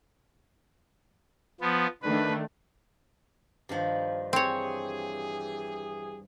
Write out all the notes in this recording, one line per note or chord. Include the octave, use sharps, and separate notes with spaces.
F3 B3
D#3 A3 D4 B4
G2 D#3 F3
E3 C4 G4 G#4 C#5